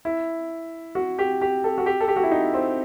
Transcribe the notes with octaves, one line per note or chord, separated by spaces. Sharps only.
E4
F#4
G4
G4
A4
F#4
G4
A4
G4
F#4
E4
D#4
C4